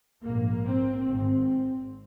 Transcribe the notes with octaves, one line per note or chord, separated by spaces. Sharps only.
A#1 G#2 A#3
C4
G#1 G#2 C4